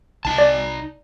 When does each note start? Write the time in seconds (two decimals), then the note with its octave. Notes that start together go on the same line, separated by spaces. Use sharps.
0.25 C2 D#4 A5
0.38 D5